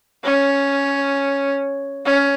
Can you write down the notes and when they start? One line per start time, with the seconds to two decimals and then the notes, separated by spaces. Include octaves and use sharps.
0.25 C#4
2.06 C#4